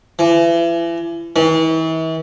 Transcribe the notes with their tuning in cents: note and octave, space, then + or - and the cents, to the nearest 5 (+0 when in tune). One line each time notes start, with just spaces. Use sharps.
E3 +35
E3 -40